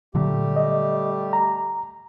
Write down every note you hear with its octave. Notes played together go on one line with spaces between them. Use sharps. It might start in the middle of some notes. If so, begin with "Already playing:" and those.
A#2 D3 F#3 G3 A3 G4
D#5
A#5